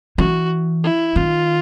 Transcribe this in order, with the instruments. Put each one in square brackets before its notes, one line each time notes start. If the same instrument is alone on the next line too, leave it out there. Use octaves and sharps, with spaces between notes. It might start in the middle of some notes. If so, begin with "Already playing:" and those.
[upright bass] E3 [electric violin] F#4
[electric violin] E4
[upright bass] D#3 [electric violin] F4